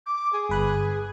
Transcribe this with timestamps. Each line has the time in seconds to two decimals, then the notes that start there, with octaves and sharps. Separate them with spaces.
0.06 D6
0.33 G#4
0.49 G1 B4 F#6